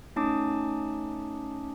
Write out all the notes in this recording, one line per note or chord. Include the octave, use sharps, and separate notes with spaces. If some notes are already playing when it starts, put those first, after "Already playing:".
A3 C#4 D#4 A5 D6 D#6